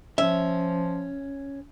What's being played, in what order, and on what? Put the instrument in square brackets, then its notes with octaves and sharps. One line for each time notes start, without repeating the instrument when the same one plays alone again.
[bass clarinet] F3 [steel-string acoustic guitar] C#4 [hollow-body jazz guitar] E5